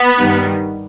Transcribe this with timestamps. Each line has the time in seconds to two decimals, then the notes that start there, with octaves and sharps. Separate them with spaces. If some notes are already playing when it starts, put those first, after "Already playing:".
Already playing: B3
0.18 G2 D#3 G3